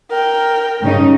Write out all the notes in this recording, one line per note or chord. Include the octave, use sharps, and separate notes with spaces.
A#4 G5
G2 C#3 D#4